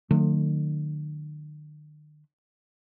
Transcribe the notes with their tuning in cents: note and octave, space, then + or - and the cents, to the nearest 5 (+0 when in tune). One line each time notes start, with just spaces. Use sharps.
D3 +45 F#3 -35 A3 +30